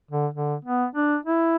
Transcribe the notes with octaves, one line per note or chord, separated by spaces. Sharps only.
D3
D3
B3
D4
E4